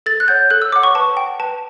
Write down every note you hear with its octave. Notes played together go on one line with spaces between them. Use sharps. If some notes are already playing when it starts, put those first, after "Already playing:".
A4 A6
F#6
C#5 F#5 G6
A4 F#6
E6
C#5 F#5 D6
C#6
B4 A5
F#5 G5
B4 A5